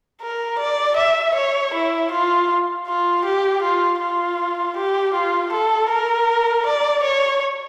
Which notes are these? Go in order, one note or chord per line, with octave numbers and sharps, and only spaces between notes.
A#4
D5
E5
C#5
E4
F4
F4
G4
F4
F4
G4
F4
A4
A#4
D5
C#5